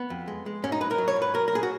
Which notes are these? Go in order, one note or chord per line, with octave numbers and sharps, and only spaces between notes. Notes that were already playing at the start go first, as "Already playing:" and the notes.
Already playing: B3
F2
G#3
G#3
G#2 C#4
D#4
F#3 B4
A#4
F#3
C#5
G#2
B4
F#3 A#4
A#4
A#2 G#4
F#4